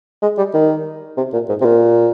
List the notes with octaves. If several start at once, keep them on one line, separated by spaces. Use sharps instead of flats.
G#3
G3
D#3
C3
A#2
G#2
C3
A#2